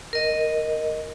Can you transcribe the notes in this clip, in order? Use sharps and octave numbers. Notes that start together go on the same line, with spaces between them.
A#4 D#5